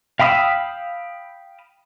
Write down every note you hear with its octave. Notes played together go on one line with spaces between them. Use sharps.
F5 G5 B5 D#6 E6